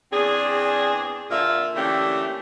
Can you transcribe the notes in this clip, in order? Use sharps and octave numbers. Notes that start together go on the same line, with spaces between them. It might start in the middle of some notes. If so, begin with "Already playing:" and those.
E2 C4 D4 G#4
A#2 D3 F4 E5
D3 E3 A3 A#3 C#4 G4